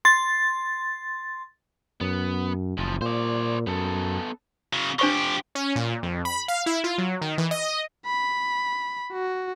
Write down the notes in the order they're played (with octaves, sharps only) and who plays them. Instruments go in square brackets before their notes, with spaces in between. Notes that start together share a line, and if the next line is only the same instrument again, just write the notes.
[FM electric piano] C6 A6
[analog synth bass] F#2 [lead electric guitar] B3
[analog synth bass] F#1 [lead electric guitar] E2 F3
[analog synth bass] A#2 [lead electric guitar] C5 D5
[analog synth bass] F#2 [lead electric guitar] B3 A4
[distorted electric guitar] C#3 F#3
[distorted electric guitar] F3 G4 [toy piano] D4 C5 C#6
[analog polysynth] C#4
A#2
F2
B5
F5
E4
F4
F#3
D#3
E3
D#5
[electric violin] B5
F#4